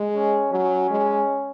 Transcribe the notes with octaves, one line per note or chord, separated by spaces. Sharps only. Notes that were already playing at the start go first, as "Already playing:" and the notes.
Already playing: G#3
C#4
F#3 C#4
G#3